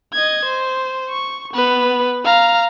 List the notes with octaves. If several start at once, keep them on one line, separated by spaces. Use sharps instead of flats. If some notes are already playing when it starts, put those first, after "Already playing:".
D#5 G#6
C5
C#6
B3 B4
F5 A#5